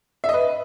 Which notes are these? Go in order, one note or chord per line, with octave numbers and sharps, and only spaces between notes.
E5
D#5
B4